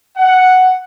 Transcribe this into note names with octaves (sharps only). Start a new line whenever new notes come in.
F#5